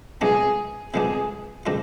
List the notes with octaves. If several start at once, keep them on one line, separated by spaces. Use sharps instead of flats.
C3 F3 G#3 B3 D4 G#4
C3 F3 G#3 B3 D4 G#4
C3 D#3 G#3 D4 F4